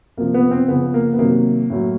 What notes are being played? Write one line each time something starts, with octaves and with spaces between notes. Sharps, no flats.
C3 F3 A#3
B3
C4
C#3 F3 B3
A#3
B3
C3 D#3 F#3 A#3
A2 F#3